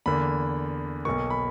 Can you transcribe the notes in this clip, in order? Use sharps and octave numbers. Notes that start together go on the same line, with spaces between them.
E2 D3 A#3 B5
B1 B2 A#3 C#6
B5